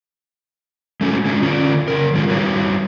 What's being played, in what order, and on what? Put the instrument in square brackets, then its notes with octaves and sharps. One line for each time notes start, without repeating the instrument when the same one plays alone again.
[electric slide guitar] G#3 A3 C#4 F#4
G#3 C#4 D4 F4
D3 C#4 F4 D5
C#3 A#4
D#3 G#3 B3 F4
G3 F#4 B4 C#5